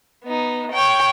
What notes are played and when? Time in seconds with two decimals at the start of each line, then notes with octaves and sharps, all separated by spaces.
0.24 B3 D#4
0.72 C#5 G5